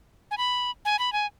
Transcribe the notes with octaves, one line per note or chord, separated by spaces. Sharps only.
G#5
B5
G#5
B5
G#5